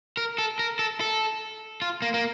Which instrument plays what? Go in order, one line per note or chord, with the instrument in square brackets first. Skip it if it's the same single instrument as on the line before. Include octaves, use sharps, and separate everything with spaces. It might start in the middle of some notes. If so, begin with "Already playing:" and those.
[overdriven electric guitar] A#4
A4
A#4
A4
A4
F4
A#3
A#3